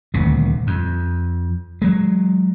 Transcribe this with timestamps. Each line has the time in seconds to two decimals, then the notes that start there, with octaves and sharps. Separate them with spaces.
0.14 D#1 D2 C3
0.67 F2
1.82 F#3 G#3